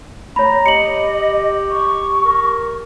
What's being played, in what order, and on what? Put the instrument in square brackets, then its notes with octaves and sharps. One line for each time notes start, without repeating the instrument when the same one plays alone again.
[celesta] C#5 B5 [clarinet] A#5
[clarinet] G4 [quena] D#5 [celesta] C#7 F#7
[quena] C#6
[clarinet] A#4